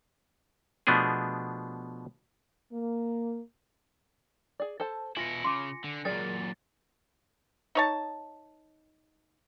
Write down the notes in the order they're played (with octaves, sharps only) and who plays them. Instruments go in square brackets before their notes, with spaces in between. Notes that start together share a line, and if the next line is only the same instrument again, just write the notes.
[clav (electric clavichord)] B2 F3 A3 B3 D4 G#4
[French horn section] A#3
[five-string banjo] G#4 D5
A4 C5 A5
[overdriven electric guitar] B2 E4 [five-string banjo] F4 [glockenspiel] G#5 A#6 C#7
[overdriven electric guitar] C#3 [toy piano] C6 D6
[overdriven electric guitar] D3
[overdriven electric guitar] F#2 A#2 [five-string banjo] G#4 A#4 D5 [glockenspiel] A6
[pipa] D#4 C#5 A5